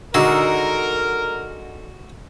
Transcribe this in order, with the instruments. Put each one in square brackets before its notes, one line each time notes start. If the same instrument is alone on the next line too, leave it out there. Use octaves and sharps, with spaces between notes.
[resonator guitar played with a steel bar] D3 G#3 D#4 [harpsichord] F#4 [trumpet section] A#4